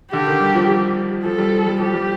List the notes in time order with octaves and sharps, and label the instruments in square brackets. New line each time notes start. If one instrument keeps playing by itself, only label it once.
[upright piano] D3 [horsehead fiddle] G4
[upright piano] D#3
G3
F3
[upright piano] F3 [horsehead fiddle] A4
[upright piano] G3
F3
G3
[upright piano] F3 [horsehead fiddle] G4
[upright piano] G3